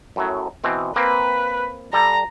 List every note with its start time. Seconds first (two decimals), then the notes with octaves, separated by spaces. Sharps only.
0.16 F#2 A2 F#3
0.64 B2 E3 C4
0.96 A#3 C4 B4
1.93 G3 A4 A#5